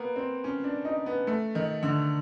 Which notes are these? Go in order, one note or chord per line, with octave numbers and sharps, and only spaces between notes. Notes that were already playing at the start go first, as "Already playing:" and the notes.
Already playing: A#3 B3
C4
C#4
D4
D#4
B3
A3
D#3
D3